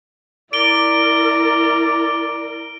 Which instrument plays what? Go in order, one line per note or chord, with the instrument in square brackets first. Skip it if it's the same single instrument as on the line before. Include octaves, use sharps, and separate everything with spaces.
[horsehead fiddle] E4 A#4 [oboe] D5 [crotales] D7 G7